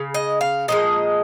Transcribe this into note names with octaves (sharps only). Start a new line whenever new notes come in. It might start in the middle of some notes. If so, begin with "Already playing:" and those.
Already playing: C#3
D#5
F5
A#2 F3 G#3 D#5